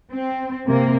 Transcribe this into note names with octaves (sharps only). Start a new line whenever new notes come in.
C4
C3 A#3